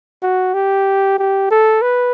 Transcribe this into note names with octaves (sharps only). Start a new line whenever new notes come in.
F#4
G4
G4
A4
B4